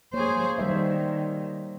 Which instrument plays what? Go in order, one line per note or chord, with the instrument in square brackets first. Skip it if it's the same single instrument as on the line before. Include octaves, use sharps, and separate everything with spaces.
[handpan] A#3 C#5 [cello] G#4 C5
[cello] D#3 [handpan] G3 C5 E5